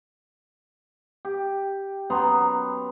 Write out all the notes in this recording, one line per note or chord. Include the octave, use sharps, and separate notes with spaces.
G4
F#2 B3 A#5 C6